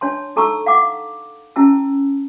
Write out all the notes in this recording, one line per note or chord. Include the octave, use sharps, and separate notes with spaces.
D4 C#5 A5 C6
D#4 A4 A5 A#5 C#6 E6
F5 F#5 D6
C#4 E4 A5 E6